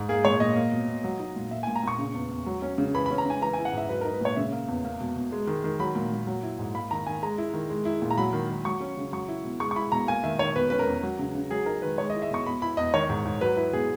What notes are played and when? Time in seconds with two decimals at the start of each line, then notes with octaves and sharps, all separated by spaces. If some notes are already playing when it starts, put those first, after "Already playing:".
Already playing: G#2
0.09 A#3 G#4
0.25 A#2 C#5
0.40 A#2 D#5
0.56 A#3
0.72 B2
0.88 B2
1.04 F#3
1.19 D#4
1.36 A#2
1.51 A#3 E5
1.63 G#5
1.67 A#2
1.76 A#5
1.83 A#2 C#6
1.99 C#3
2.14 E2
2.30 E2
2.46 F#3
2.62 C#4
2.78 C#3
2.95 E3 B5
3.06 B5
3.11 C#4
3.18 A#5
3.26 C#3 G#5
3.42 E3 A#5
3.53 G#5
3.58 E4
3.65 F#5
3.73 G#2 E5
3.89 F#3 B4
4.01 A#4
4.05 D#4
4.14 B4
4.21 A#2 C#5
4.36 C#3 E5
4.52 A#3
4.68 E2
4.85 A#3
5.01 B2
5.16 B2
5.32 G#3
5.47 D#3
5.64 D#3
5.80 F#3 B5
5.96 A#2
6.12 A#2
6.27 F#3
6.43 E4
6.59 G#2
6.75 A#3 B5
6.91 D#3 A#5
7.06 D#3 G#5
7.23 G#3 A#5
7.38 E4
7.54 D#3
7.70 G#3
7.85 E4
8.02 A#2
8.11 A#5
8.18 F#3 B5
8.33 D#3
8.50 D#3
8.65 F#3 C#6
8.81 C#4
8.97 C#3
9.12 F#3 C#6
9.28 E4
9.45 B2
9.60 G#3 C#6
9.71 C#6
9.76 E4 B5
9.92 B2 A#5
10.07 A#3 G#5
10.24 D#3 E5
10.39 D#3 C#5
10.56 B2 B4
10.70 C#4 B4
10.79 A#4
10.87 E2
11.03 F#3
11.19 C#3
11.35 C#3
11.51 F#3 G#4
11.66 D#4 A#4
11.82 D#3 B4
11.98 G#3 C#5
12.10 D#5
12.15 E4
12.22 E5
12.31 B2 C#6
12.46 B2 B5
12.62 E4 B5
12.77 E2 D#5
12.94 D#3 C#5
13.10 G#2
13.25 G#2
13.41 F#3 B4
13.57 E4 B4
13.73 B2 G#4